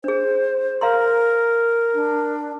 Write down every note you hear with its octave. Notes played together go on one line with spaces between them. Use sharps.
D4 G#4 C5
A#4 F5 A#5 C6
D4